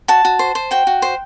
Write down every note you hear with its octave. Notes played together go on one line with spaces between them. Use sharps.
F#4 A5
F#4
C5
C5
F#4 G5
F#4
C5